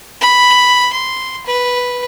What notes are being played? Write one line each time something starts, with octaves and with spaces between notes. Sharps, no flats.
B5
C6
B4